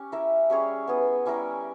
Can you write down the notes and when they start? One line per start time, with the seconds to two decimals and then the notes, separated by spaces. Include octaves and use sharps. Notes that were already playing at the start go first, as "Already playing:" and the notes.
Already playing: C#4 G4
0.12 E4 A#4 E5
0.50 G3 C#4 G#4 C#5
0.87 B3 E4 G#4 B4
1.26 G3 C#4 E4 A#4